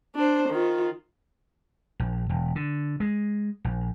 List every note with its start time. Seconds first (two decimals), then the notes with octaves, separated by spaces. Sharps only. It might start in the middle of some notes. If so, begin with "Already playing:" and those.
0.16 D4 C5
0.50 D#3 F4
2.00 A#1
2.29 E1
2.55 D3
3.00 G#3
3.65 A#1